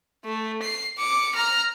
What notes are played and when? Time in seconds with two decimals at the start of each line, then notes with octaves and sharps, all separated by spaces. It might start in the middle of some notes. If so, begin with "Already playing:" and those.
0.25 A3
0.62 C7
0.98 D6 C#7
1.35 A#5 F6